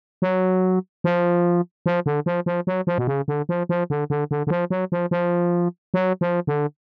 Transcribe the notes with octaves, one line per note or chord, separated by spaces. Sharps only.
F#3
F3
F3
D3
F3
F3
F#3
F3
B2
C#3
D3
F3
F3
D3
D3
D3
D3
F3
F#3
F3
F3
F#3
F3
D3